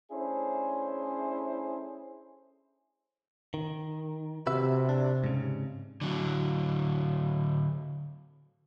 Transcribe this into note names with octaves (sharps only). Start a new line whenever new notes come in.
A3 C#4 D4 E4 G#4 C5
D#3
C3 F#4 B4 E5
D4
G#2 C#3
D3 F#3